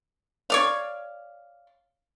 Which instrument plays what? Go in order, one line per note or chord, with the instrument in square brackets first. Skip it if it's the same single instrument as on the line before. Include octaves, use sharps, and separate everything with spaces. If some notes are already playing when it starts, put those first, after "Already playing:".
[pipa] C#5 D5 F5